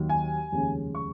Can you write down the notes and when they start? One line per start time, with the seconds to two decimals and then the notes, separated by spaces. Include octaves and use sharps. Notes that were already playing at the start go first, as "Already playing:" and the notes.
Already playing: D#2 D#3 F#3
0.09 G#5
0.52 F1 D#2 C#3 G#3 C#4
0.95 C#6